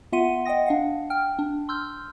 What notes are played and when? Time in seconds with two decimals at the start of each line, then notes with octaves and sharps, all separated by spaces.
0.12 B3 F4 E5 F#5 C6 D#7
0.45 D#5 F#5 G5 D#6 A#6
0.66 D4 F5 F#5
1.10 G5 F6
1.39 D4
1.69 C6 E6 F6 G6